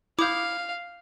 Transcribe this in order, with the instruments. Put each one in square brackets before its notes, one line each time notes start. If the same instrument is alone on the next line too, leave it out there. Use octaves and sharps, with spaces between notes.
[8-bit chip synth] E4 [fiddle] F5 [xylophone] D6 D#6 G6